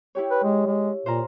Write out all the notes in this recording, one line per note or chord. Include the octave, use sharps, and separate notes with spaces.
E4 G4 C#5
B4
G#3
G#3
A#2 C5 F5 A#5